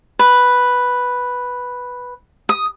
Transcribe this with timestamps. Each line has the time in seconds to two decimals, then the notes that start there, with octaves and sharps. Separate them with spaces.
0.19 B4
2.49 D#6